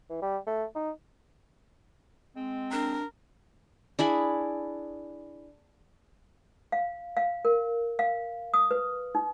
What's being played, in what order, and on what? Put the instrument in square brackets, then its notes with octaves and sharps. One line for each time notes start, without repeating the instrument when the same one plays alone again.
[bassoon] E3
G3
A3
D#4
[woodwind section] G#3 C4
[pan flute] D4 [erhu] A#4
[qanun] D4 E4 G#4 B5
[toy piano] F5
F5
A#4
F5
D#6
B4
D#4